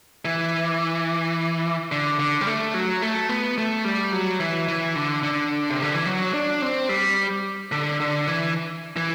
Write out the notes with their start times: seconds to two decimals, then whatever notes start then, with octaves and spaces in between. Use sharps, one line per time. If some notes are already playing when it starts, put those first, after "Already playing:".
0.25 E3
1.92 D3
2.19 D3
2.41 G3
2.47 A3
2.74 F#3
3.02 A3
3.29 B3
3.58 A3
3.85 G3
4.12 F#3
4.40 E3
4.68 E3
4.96 D3
5.23 D3
5.69 C3
5.82 D3
5.94 E3
6.06 F#3
6.34 D4
6.62 C4
6.89 G3
7.72 D3
8.00 D3
8.27 E3
8.97 E3